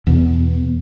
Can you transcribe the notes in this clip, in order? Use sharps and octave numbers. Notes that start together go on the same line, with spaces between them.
E2 B2 B3